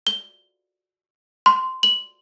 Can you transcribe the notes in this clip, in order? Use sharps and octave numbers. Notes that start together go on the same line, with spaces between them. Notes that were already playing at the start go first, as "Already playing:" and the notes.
G7
C6
F#7